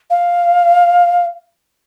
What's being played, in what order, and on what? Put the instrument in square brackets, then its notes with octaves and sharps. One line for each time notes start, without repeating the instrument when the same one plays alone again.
[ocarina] F5